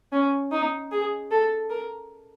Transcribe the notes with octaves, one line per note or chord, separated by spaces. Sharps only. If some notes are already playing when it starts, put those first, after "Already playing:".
C#4
D#4
G#4
A4
A#4